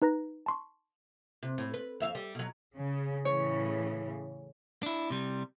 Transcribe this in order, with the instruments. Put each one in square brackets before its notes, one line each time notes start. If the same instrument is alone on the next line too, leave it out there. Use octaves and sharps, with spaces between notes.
[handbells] D#4 B4 A#5 A#6
A5 C6 C#6
[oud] C3
A2
B4
F2 E5 F5
G3
B2 F#3
[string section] C#3
[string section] A2 C#3 E3 [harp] C#5
[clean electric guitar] D4 E4
C3 G3